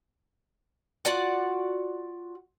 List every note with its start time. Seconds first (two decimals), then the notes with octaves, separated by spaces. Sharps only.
1.05 F4 F#4 D5 F#5